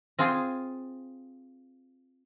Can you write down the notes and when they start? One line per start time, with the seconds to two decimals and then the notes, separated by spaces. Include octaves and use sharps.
0.19 C4 F4 G#4